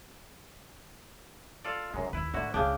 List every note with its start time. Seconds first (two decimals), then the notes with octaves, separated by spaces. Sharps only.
1.65 F4 A4 D5
1.94 F#2 C#3 G#3
2.13 D#2 E4 B4
2.34 A2 D3 E4 F#4
2.54 C#2 C#3 D4 G5